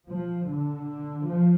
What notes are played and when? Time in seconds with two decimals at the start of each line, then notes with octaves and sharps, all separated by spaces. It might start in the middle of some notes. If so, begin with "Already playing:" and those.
0.09 F3
0.48 D3
1.27 F3